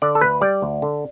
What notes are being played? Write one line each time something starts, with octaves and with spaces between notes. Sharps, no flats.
D3 D5
A4
D2 B4
G3 D5
D2
D3